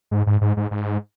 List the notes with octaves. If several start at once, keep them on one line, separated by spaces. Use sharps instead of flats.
G#2
G#2
G#2
G#2
G#2